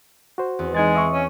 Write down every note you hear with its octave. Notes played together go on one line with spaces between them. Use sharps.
F#4 C5
E2 C4
G#3 D#4 G#6 A6
D#5 E5 C#6
C#4